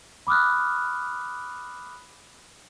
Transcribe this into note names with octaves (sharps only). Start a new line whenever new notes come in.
B5 D6 D#6 F6 F#6